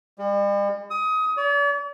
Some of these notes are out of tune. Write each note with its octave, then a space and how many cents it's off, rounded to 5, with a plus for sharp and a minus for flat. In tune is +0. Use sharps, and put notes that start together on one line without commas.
G3 +45
D#6 +25
D5 -45